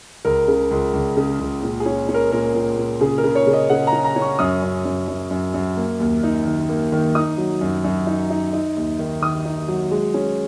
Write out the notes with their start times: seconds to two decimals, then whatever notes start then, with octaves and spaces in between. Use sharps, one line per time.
0.25 C#2 A#4
0.48 C#3
0.71 C#2
0.94 C#2
1.17 C#3
1.40 C#2
1.63 A#2
1.80 G#4
1.86 C#4
2.09 C#4
2.14 A#4
2.32 A#2 A#4
2.55 A#2
2.78 A#2
3.01 C#3 G#4
3.18 A#4
3.24 C#3
3.35 C#5
3.47 C#3
3.53 D#5
3.70 C#3 F#5
3.87 A#5
3.93 C#4
4.04 A#5
4.16 C#4
4.21 C#6
4.39 F#2 D#6
4.62 F#2
4.85 F#2
5.08 F#2
5.31 F#2
5.54 F#2
5.77 A#3
6.00 D#2
6.23 D#4
6.46 D#3
6.69 A#3
6.92 D#3
7.15 D#4 D#6
7.38 F#3
7.61 F#2
7.84 F#2
8.07 D#4
8.30 D#4
8.53 D#4
8.76 D#2
8.99 D#3
9.22 D#3 D#6
9.45 D#4
9.68 F#3
9.91 G#3
10.14 C#4